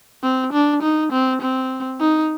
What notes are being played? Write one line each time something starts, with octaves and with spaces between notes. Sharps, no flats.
C4
D4
D#4
C4
C4
D#4